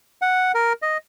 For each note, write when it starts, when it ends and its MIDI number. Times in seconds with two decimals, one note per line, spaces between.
0.22 0.52 78
0.54 0.73 70
0.82 0.97 75